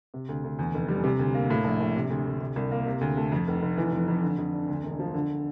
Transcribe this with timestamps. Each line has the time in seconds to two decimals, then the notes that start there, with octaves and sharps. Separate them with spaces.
0.14 C3
0.29 D2
0.44 D2
0.59 E2
0.74 F1
0.88 G3
1.04 C3
1.19 D2
1.35 A#3
1.50 A2
1.64 A#1
1.80 A#1
1.96 C3
2.10 D2
2.26 D2
2.41 C3
2.56 C2
2.71 A#3
2.87 C3
3.01 D2
3.17 A3
3.32 F2
3.48 F1
3.62 F1
3.78 E3
3.92 F2
4.08 F2
4.23 D3
4.38 F2
4.54 D4
4.68 D2
4.83 E1
5.00 F3
5.14 D3